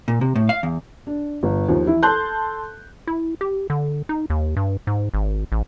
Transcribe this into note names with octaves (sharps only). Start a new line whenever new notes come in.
A#2
C3
A2
F5
E2
D4
G1
D#2 D#3 F3
E3 E4
A4 A5 C6 F#6 G6
E4
G4
D3
D#4
D#2
G2
G#2
G#1
A1